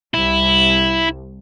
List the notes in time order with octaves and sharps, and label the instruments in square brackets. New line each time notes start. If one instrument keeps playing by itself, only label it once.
[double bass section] C2 [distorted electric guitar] E4